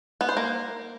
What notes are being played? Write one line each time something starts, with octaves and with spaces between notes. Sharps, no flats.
B3
C5
A#3